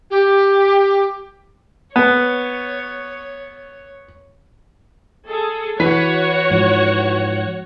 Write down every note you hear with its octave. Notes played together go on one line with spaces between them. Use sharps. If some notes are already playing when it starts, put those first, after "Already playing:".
G4
B3 C#5
G#4 A4
E3 F#4 B4 C#5 F#5 B6
G#2 F3